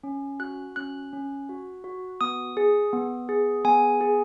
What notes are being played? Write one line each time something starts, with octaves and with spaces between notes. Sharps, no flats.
C#4
F#4 F#6
C#4 F#6
C#4
F#4
F#4
B3 D#6
G#4
B3
G#4
B3 G#5
G#4